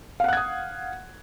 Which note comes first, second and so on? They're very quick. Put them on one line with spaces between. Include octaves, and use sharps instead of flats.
F5 F#5 F#6 G#6 D#6